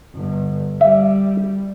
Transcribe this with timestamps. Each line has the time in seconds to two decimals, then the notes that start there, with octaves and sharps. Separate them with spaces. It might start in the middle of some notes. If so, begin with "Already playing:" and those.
0.14 G1
0.81 G3 E5